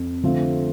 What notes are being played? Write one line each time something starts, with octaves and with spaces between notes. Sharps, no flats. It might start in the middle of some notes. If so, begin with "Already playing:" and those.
Already playing: F2
D3 F3 A3 C4 F4